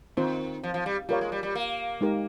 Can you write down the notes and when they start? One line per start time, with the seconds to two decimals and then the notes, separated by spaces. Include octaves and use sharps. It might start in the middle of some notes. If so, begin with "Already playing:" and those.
0.17 D#3 C4 F4 C5
0.64 F3
0.74 F3
0.86 G3
1.09 G3 F4 A#4 C#5 F5
1.21 G#3
1.32 G3
1.43 G3
1.55 A#3
2.01 G#3 D#4 G4 A#4